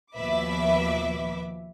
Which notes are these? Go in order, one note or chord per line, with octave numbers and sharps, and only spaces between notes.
D#2 B2 F3 B4 E5 D6